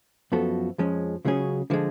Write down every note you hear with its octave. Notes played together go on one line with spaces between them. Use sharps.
F#2 F3 B3 F#4 A4
F2 F3 G#3 C#4
C#2 C#3 F#3 C#4 G#4
D3 F3 G#3